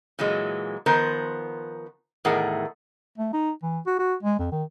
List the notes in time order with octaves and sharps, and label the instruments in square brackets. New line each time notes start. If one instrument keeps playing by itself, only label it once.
[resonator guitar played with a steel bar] A#2 E3 F#3 G#3
D#3 F3 B3 A#4 C5
E2 A2 D#3 G#4 A#4 F#5
[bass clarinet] A3
D#4
E3
F#4
F#4
G#3
F2
D#3